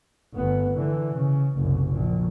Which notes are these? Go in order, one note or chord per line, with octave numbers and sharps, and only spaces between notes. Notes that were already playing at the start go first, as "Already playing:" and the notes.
G1 B3
D3 E3
C#3
F#1 C2
A#1